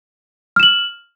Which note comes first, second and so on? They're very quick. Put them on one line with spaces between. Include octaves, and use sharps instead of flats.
F6 E7 F#7